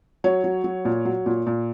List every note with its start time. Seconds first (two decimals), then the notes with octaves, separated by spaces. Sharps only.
0.24 F#3 C#5
0.44 F#3
0.64 F#3
0.85 A#2
1.05 F#3
1.26 A#2
1.46 A#2